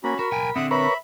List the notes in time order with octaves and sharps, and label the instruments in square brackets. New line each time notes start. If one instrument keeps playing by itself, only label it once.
[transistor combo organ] A#3 [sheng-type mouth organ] C#4 F#4 B5
[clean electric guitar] F#4 [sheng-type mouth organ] A#4 [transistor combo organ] B5
[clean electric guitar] B1 G5 G#5
[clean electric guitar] D3 C4 [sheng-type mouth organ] E5 F#5 D#6
[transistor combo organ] A#4 B4 C#5 [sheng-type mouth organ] E5 B5